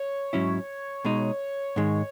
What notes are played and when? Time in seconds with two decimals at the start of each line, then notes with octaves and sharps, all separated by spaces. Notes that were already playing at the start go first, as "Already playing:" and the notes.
Already playing: C#5
0.33 G#2 F#3 C#4 E4
1.05 B2 G#3 D#4
1.76 G#2 D#3 G#3